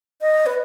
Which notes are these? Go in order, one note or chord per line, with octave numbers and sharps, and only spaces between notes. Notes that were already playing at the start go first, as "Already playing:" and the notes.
D#5
B4